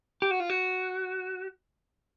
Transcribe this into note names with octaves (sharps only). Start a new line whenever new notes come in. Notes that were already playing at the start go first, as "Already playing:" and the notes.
G4
F#4
F4
F#4